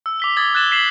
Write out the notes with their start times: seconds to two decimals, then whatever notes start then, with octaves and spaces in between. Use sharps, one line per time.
0.06 E6
0.20 D6 B6 G7
0.37 D6 D#6 G#6 A6 G7
0.55 F#6 G#6 A6 E7 F#7 G7
0.72 B6 C7 E7 F#7